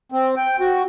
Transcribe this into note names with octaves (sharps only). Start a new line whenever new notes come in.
C4
G5
F#4